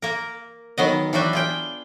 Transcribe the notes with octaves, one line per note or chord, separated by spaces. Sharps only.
A#3 A#4
D#3 F#3 B3 D#5
E3 F#3 D4 F#4 G4 E5
F4 G#4 G5